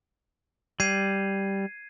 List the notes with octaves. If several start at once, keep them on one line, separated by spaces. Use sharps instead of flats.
G3 G#6 C7 D#7